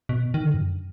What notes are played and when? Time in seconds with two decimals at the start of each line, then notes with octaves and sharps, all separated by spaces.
0.09 B2
0.34 D#3
0.44 D3
0.54 F#2